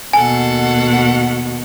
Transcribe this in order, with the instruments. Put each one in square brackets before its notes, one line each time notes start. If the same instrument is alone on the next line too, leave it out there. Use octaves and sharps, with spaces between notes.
[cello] D#2 B2 [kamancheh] A4 F#5 [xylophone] G#5